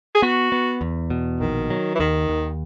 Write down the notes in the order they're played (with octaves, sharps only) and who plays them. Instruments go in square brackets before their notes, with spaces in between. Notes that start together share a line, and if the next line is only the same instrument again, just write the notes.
[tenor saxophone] G#4
[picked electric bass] B3 [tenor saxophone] F#4
[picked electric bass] B3
E2
B2
[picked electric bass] A#1 [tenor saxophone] D#3
[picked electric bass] F#3
[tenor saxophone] E3
[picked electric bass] D#2 [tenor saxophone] D#3
[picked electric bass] D#2